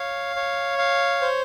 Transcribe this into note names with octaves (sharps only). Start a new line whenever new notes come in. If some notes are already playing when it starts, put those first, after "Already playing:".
Already playing: C#5 F5
C#5
F5
C5